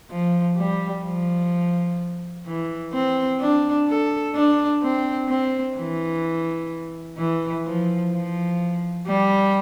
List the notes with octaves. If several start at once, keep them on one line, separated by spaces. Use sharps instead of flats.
F3
G3
F3
E3
C4
D4
A4
D4
C4
C4
E3
E3
F3
F3
G3